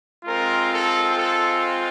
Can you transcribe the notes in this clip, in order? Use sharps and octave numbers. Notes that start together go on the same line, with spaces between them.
G#3 C4 F4 A#4
A4
A4